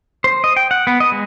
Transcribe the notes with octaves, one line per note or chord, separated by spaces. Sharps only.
C5
D#5
G5
F#5
B3
D#5
G#3